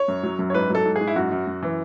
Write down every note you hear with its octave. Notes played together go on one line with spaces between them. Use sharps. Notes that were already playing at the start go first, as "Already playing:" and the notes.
Already playing: C#5
F#2
F#3
F#2
C#5
G#2 B4
F#3 A4
G#2
G#4
G#2
E4
F#2 F#4
F#2
F#2
E3